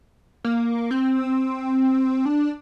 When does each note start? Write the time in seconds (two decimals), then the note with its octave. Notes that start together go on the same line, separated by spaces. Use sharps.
0.45 A#3
0.91 C4
2.25 D4